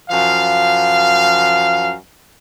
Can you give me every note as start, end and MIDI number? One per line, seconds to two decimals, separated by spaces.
0.10 1.93 42
0.10 1.93 53
0.10 1.93 77